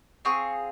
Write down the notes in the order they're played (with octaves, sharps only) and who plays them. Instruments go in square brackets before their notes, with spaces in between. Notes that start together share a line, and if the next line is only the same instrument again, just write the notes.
[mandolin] C4 F4 G#4 C#6